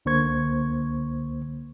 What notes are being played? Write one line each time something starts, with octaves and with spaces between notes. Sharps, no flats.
C#2 D3 A#3 C5 C#6 G#6